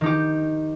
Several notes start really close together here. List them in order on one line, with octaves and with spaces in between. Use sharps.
D#3 D#4 G4